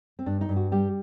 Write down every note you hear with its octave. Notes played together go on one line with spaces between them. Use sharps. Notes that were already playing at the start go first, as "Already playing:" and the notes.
C4
G2 D4
D#4
G2
F#4
G3 G4